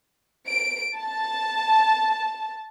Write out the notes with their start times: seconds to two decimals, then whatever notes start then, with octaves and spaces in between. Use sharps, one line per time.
0.48 D7
0.98 A5